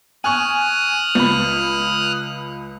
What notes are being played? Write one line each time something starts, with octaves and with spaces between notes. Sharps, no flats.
G#5 C#6 D#6 F6 F#6
C#2 B5